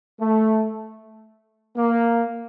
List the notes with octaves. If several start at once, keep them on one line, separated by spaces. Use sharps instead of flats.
A3
A#3